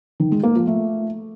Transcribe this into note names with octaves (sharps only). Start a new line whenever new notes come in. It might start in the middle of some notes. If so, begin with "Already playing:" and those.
D#3
G#3
A#3
F3
A3